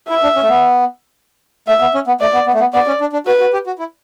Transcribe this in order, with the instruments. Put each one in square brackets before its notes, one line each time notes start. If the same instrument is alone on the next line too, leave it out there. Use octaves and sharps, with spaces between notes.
[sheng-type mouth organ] E4 [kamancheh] E5
[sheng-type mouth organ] D4
C#4
A3
B3
[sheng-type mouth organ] A3 [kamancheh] E5
[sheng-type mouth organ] B3
C#4
B3
[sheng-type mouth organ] A3 [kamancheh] D5
[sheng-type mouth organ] B3
B3
A3
B3
[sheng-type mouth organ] B3 [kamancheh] D5
[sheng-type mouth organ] C#4
D4
D4
[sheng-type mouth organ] F#4 [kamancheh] B4
[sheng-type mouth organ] F#4
G4
F#4
E4